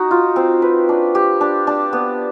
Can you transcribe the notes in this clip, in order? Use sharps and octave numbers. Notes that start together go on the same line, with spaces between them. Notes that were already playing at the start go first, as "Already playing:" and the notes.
Already playing: D#4 F#4
F4
C4
B4
D4
G4
D4
D4
B3